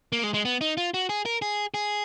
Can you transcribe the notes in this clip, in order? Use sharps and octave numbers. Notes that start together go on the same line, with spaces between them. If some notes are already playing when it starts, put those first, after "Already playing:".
A#3
G#3
G#3
B3
D#4
F4
F#4
G#4
A#4
G#4
G#4